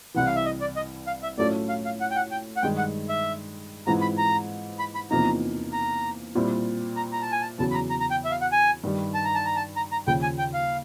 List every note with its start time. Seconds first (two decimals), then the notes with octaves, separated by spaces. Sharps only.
0.14 C2 C3 E3 F#5
0.26 F5
0.36 E5
0.45 D#5
0.61 D5
0.76 D#5
1.07 F5
1.23 E5
1.38 A2 F#3 A3 C#4 F4 D5
1.69 F5
1.85 F5
2.01 F#5
2.11 G5
2.16 F#5
2.31 G5
2.57 F#5
2.62 G2 D#3 G#3 G5
2.78 F#5
3.09 E5
3.87 G#2 E3 G#3 C4 F4 A#5
4.02 B5
4.18 A#5
4.79 B5
4.95 B5
5.11 E2 C3 F3 A#3 D#4 A#5
5.73 A#5
6.35 A#2 G3 C4 E4
6.97 A#5
7.12 A#5
7.22 A5
7.32 G#5
7.42 A5
7.58 E2 C#3 F#3 A5
7.71 B5
7.75 A#5
7.90 A#5
8.00 A#5
8.11 G5
8.25 E5
8.31 F5
8.41 F#5
8.52 G#5
8.84 G2 D#3 G3
9.14 A5
9.25 A#5
9.35 A5
9.45 A#5
9.56 A5
9.76 A#5
9.92 A#5
10.07 D#2 C#3 F3 G5
10.22 G#5
10.39 G5
10.54 F5